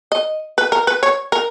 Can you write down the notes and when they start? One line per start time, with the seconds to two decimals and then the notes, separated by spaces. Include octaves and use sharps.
0.12 D#5
0.58 B4
0.72 A#4
0.87 B4
1.03 C#5
1.32 A#4